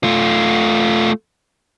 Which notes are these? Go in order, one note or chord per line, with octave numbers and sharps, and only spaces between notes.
A3 F4